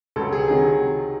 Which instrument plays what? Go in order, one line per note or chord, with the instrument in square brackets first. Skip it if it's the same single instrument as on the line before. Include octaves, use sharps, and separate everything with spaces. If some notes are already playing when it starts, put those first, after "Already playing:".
[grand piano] C#2 C#3 F#3 A4
G#4
C3 D#3 F#3 G#4